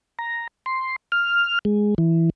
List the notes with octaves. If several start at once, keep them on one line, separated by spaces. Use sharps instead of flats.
A#5
C6
F6
G#3
E3